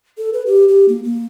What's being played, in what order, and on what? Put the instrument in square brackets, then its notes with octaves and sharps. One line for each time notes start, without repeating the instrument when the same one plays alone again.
[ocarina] A4
B4
G4
G4
A#3
A#3